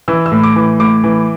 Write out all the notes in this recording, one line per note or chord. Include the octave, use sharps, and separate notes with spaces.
E3 E6
E6
A2
D6
E3
A2 D6
E3